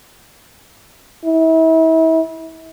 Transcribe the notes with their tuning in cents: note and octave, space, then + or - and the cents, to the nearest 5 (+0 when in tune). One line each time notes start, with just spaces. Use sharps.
E4 -35